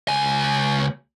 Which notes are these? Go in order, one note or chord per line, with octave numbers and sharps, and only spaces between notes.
C#2 G#5